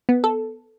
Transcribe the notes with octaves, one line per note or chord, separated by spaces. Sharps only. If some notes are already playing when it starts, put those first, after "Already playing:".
B3
A4